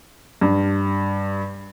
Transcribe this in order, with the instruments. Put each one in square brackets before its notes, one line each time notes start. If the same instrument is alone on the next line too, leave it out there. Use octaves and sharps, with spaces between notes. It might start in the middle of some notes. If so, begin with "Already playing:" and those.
[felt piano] G2